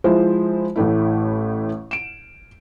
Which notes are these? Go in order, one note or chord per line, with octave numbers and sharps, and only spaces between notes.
F3 G#3 E4 C5
A1 A2 A3 E4
D7 E7